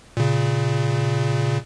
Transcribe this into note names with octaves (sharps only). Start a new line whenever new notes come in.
A#2 C#3